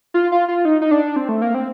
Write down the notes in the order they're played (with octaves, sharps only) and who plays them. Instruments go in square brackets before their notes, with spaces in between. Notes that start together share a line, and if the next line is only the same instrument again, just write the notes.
[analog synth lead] F4
F4
F4
D#4
D#4
D4
C4
A3
A#3
C4